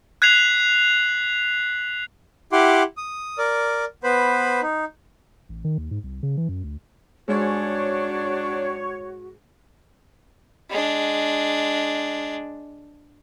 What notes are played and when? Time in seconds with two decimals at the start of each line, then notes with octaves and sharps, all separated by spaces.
0.22 F#6 G#6 B6 C7 F7 F#7
2.52 E4 G4 F#5 C6 D6
2.97 D#6
3.38 A#4 D5
4.04 B3 B4 C5 B5
4.62 D#4
5.49 A1
5.64 D#3
5.78 D#2
5.91 G#2
6.04 C2
6.23 C#3
6.37 E3
6.49 F#2
6.64 D2
7.28 G#2 F#3 C4 D4 F#4 C#5
10.70 G#3 D4